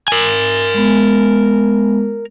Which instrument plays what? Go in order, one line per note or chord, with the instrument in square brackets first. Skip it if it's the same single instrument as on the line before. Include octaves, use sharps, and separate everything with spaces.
[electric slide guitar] A#4 G#5
[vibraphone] G#3 B3